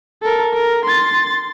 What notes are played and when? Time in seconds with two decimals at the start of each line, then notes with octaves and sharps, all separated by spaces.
0.23 A4 A#4
0.54 A#4
0.85 C6 A6